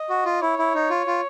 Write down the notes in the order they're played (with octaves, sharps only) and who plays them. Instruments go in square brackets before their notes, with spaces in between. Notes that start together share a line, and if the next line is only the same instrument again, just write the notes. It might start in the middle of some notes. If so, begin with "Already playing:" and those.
Already playing: [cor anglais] D#5
[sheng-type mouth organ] F#4
F4
[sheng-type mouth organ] E4 [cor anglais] C#5
[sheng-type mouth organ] E4
D#4
F4
F4